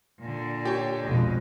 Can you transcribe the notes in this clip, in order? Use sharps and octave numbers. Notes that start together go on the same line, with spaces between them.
A#2 D3
G4 C#5
B1 F2 B2 G#3 D#5